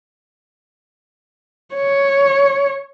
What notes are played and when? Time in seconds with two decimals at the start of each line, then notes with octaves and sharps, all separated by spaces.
1.75 C#5